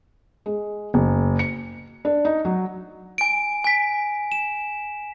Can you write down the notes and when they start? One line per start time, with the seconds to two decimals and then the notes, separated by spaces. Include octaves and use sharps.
0.46 G#3
0.94 F#1
1.39 C#7
2.05 D4
2.25 D#4
2.45 F#3
3.18 G#5 D7
3.64 G#5 B6
4.32 E7